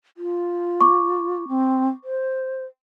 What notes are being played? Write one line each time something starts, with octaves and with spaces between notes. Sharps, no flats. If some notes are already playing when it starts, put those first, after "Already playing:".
F4
C#6 D6
C4
C5